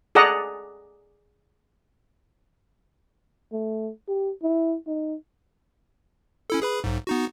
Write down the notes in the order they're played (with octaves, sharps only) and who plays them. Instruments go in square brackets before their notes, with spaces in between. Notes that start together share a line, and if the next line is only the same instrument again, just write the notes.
[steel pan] G#4 A4 D5 D#5 F#5 A#5
[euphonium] A3
G4
E4
D#4
[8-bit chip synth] C#4 E4 A4
G#4 B4 B5
B1 G#2
B3 D#4 F#4